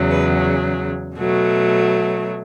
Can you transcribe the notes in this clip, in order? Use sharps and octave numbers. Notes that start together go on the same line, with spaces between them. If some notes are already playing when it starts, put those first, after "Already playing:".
Already playing: E2 C#3 F#3
B4
B2 F#3 A3